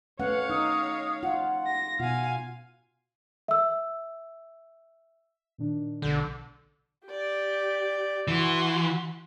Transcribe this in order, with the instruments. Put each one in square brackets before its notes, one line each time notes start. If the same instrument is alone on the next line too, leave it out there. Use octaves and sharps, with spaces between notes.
[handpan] A3 C#4 F#5 [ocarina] B4 [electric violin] C#5 F5
[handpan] D#4 [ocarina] D#6
[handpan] F4 [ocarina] F#5
[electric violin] A#6
[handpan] B2 F4 [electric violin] F5 G#5 [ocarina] F#5
[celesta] E5 E6
[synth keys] A#2 D#3 D4
[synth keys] A#1 B2 G6 [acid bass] D3
[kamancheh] G4 D5
[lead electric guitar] E3 [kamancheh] F#4 C6